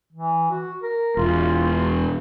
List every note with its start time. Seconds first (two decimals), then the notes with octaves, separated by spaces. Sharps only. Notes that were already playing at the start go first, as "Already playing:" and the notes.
0.13 E3
0.50 F#4
0.82 A#4
1.17 E1 F4